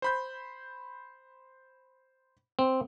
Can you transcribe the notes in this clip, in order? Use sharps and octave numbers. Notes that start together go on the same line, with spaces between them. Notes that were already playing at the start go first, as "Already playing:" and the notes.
C5 B5 G6
C4